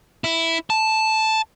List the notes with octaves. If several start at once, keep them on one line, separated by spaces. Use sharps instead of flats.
E4
A5